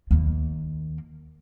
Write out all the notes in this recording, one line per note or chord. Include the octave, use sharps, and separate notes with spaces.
D#2 A#3